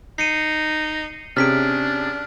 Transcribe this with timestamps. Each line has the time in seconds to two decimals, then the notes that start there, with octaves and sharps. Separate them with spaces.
0.18 D#4 C7 C#7 D#7
1.37 C3 C#4 D4 G#4 F6 B6 D7